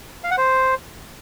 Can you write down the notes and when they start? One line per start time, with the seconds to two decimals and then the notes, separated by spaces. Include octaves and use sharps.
0.24 F5
0.31 F#5
0.38 C5